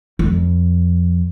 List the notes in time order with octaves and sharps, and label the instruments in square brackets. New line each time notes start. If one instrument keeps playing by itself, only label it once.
[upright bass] F2